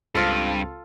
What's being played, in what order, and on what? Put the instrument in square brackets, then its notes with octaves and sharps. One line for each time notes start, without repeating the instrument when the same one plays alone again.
[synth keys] C#2 C4 F5 [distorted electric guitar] G2 [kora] F4 A4